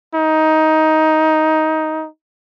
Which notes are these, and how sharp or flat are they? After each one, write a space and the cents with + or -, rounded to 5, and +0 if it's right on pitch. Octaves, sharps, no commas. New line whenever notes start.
D#4 +15